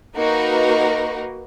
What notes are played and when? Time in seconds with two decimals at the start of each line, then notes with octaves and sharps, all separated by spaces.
0.16 A#3 D#4 F#4 A#4 B4